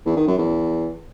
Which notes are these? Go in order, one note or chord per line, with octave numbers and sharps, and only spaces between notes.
E2
D#3
F#2
E2